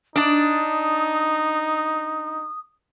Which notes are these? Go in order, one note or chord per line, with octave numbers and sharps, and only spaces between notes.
D4 D#4 D5 D#6